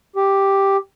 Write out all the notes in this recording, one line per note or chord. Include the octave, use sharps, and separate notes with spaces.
G4